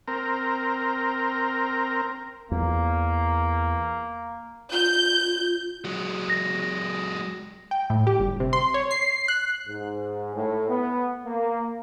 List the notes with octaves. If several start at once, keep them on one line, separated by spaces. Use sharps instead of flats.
C4 A#4
E2 A#3
F4 G6
F#3 G#3
A#6
G5
A2
G4
G1
C3
C6
C#5
C7
F#6
G#2
A2
B3
A#3